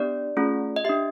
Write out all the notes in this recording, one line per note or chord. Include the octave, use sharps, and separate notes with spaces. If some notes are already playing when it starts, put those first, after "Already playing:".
Already playing: B3 D4 G4 D5
A3 C#4 F4 G#4
D#5
D4 G4 E5